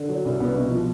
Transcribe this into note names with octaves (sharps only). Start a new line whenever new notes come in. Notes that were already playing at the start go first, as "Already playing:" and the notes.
Already playing: D3
F#3
C2
C2 B3
B2
F3